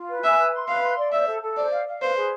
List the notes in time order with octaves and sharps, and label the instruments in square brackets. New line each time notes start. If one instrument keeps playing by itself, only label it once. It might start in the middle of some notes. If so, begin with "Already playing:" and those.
Already playing: [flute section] F4
B4
[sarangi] E5 [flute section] G#5
[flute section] B4
C6
[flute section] B4 [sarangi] F5
[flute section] C6
D5
[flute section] C5 [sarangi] E5
[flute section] A4
A4
[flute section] C5 [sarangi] D5
[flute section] F5
F5
[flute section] B4 [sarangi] C5
[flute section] G#4